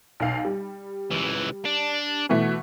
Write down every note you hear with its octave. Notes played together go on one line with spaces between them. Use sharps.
B1 F5
G3
C#2 E3
D4
B2 E3 A3